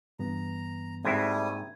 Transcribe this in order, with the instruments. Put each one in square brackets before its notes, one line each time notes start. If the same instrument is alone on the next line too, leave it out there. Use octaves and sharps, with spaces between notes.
[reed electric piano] G2 E3 B3 [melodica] A#5
[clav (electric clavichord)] G#2 C4 E4 [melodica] G3 A3 D#6 [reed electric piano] A#3 G#6